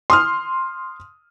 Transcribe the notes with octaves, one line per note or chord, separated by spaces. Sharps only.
C6 D#6 F6